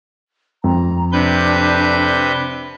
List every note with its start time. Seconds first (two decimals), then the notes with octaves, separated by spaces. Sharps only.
0.64 F2 A#5
1.12 C3 D4 B4 G6